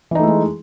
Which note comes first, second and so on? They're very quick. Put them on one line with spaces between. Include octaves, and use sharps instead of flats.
E3 D#4 A3 E4 G#3